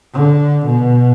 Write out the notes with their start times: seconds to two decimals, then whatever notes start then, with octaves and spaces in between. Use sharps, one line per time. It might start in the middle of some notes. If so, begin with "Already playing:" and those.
0.14 D3
0.66 B2